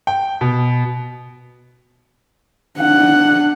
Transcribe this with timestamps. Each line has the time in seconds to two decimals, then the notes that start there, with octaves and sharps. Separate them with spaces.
0.07 G5
0.41 B2
2.79 D4 F#5